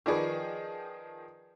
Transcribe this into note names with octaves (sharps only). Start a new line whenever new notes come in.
D#3 F3 G#4 B4 D5 C#6